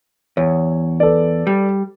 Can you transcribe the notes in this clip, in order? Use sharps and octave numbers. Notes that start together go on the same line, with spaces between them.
E2 C#5
A4 B4 D5
G3